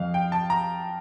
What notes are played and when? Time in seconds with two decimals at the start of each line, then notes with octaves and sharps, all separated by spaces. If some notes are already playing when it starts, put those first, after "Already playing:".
Already playing: F2 F5
0.14 G5
0.32 A5
0.50 A#5